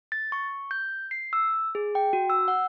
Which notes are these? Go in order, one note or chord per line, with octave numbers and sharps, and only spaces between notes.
A6
C#6
G6
C7
E6
G#4
G5
F#4
E6
F#5